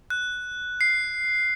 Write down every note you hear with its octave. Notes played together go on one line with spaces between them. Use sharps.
F#6
C7